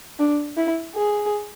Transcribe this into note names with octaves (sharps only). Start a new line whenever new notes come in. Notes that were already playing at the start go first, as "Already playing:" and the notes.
D4
E4
G#4